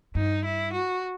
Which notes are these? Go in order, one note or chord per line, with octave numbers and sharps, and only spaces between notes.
G2 D#4
E4
F#4